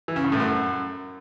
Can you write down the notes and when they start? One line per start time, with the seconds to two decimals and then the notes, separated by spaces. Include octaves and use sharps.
0.08 E3
0.16 C#3
0.24 G2
0.32 A2
0.40 F#2